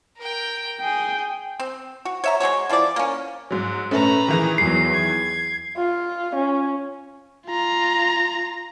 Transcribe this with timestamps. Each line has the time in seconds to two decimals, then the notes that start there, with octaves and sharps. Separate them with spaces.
0.18 A#4 G5
0.81 G#4 G5
1.60 C4
2.05 F#4
2.24 C#5 E5 A#5
2.40 G#3 C4 F#4 C#5
2.69 E3 F3 E4 D5
2.96 A#3 C#4
3.51 G#2 F#3
3.91 A#2 A3 C#4 B4 A#5
4.28 D#3 E3 G#4
4.58 E2 F#3 C7
4.92 G#6
5.77 F4
6.35 C#4
7.47 F4 A#5